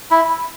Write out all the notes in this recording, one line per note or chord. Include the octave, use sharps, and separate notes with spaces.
E4